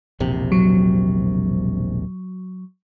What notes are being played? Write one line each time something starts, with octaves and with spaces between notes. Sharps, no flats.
E1 A#1 C3
F#3